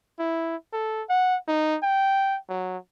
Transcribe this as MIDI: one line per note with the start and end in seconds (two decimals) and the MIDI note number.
0.19 0.56 64
0.73 1.03 69
1.10 1.37 78
1.48 1.77 63
1.83 2.38 79
2.49 2.77 54